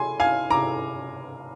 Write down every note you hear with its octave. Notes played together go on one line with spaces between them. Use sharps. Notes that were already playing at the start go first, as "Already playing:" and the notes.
Already playing: G#5 C6
F5 G#5
A#5 D6